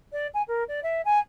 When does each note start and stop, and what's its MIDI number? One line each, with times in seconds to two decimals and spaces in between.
0.12 0.27 74
0.34 0.42 80
0.48 0.64 70
0.68 0.80 74
0.83 1.01 76
1.05 1.19 80